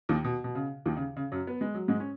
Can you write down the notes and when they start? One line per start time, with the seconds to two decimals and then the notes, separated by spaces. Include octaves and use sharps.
0.09 D#2 D#3
0.24 B2
0.44 B2
0.55 C#3
0.86 D#2 D#3
0.97 C#3
1.16 C#3
1.32 F#2 F#3
1.47 B3
1.61 G#3
1.74 F#3
1.88 G#2 G#3
2.00 C#4